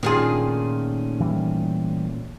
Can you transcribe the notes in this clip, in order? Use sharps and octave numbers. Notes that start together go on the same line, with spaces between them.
A#2 D#3 A3 C#4 F4 G#4
E3 G3